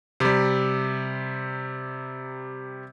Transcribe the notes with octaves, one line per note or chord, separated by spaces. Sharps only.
C3 G3